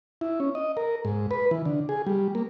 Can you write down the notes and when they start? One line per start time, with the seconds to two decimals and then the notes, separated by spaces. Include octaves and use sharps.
0.21 E4
0.40 C#4
0.55 D#5
0.77 A#4
1.05 G#2
1.31 B4
1.51 E3
1.65 D3
1.89 G#4
2.07 G3
2.35 A#3